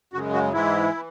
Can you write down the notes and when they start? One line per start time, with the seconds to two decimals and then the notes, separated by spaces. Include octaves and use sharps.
0.13 F#2 C#3 G#3 F#4
0.33 F#4
0.53 G#2 E3 G#3 E4
0.94 E3